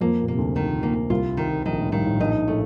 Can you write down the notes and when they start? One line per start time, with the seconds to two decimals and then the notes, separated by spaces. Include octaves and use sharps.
0.01 F2 F3 A#3
0.21 A#2
0.28 C3 A#3
0.38 D2 D3
0.56 D#3
0.83 A#3
1.10 C2 C3 F4
1.37 D#3
1.65 A#1 A#2 D#3
1.79 A2
1.92 G2 D#3
2.06 A2
2.20 A#1 A#2 D#4
2.47 A2 A3